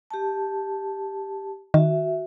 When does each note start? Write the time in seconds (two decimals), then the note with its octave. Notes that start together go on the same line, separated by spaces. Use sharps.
0.11 G4 A5
1.74 D#3 F#4 E5